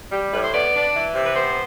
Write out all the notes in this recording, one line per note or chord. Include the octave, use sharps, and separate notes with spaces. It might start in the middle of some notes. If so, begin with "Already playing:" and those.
G3 G4
A2 B4
C5
B3 D5
D4
E3
C3
B4
B3 C5